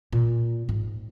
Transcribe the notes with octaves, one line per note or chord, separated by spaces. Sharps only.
A#2
G#2